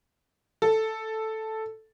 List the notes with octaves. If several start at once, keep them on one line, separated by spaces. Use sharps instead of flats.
A4